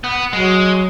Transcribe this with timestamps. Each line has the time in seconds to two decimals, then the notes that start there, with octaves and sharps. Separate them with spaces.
0.04 B3
0.33 F#3 G#3